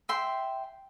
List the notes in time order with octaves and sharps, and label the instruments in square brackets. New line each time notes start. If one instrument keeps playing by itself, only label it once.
[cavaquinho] E5 G5 C6